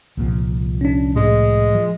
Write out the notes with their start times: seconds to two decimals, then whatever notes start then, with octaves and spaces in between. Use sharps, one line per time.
0.17 C2 A#2 F3
0.81 C#4 D4
1.16 A2 G#3
1.75 F3